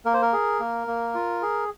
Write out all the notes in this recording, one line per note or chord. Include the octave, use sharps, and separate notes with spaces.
A#3 A#4
C5
A#4
G#4
A#3
A#3
F4
G#4